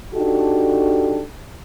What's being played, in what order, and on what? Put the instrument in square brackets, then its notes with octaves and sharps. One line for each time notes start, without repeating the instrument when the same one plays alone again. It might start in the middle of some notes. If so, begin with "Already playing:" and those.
[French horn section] D4 D#4 F#4 G4 A4